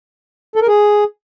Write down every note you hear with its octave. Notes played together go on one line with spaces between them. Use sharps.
A4
A#4
G#4